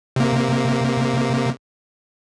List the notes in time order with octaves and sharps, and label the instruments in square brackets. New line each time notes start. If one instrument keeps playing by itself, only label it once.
[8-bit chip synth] C3 A#3